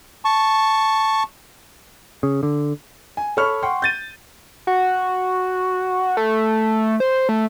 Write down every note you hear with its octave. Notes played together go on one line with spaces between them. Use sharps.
A5 C#6
C#3
D3
G#5
A4 C#5 B5 C#6 F6
F#5 G5 C6 C#6
G6 A6 D#7
F#4
A3
C5
A3